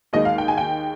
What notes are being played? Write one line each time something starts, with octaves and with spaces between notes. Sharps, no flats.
D#2 D#3 G#3 D#4 D#5
F5
G5
G#5
G5